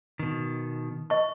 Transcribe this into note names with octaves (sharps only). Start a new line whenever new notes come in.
B2 D#3
D#5 C#6